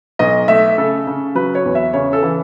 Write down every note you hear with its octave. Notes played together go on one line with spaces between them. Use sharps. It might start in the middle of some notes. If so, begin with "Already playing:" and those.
B1 D#5
A3 E5
C#3 A4
C#3
F#3 B4
C#5
E2
E5
C#3 C#5
A4
E3